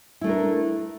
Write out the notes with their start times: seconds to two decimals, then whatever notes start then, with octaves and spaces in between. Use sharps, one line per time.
0.21 E4
0.24 A3
0.27 D4
0.29 A#4